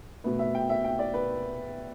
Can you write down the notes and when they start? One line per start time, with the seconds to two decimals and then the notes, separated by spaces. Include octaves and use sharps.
0.24 B2 A3 B4
0.39 E5
0.55 G5
0.69 E5
0.84 G5
0.99 D5
1.14 B4